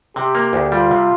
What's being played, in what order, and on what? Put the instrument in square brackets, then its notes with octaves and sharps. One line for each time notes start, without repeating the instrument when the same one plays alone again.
[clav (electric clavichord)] C3 [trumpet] G4
[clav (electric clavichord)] A#3
D2
[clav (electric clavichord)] G3 [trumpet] F4
[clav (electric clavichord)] C3